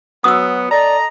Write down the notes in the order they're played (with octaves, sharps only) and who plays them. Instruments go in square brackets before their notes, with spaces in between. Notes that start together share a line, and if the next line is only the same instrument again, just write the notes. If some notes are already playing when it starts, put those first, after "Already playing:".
[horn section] F#3 B3 [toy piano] D#6 E6
[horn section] A4 D#5 A#5 [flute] D5